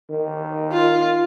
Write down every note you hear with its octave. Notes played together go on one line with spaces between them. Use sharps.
D#3
F4